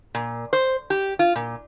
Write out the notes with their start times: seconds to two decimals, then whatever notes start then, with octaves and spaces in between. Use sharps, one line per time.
0.15 A#2
0.53 C5
0.90 G4
1.19 F4
1.36 A#2